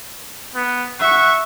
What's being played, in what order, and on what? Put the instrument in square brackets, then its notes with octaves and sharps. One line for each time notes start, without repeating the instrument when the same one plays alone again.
[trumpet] B3
[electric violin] E5 C#6 [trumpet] F#5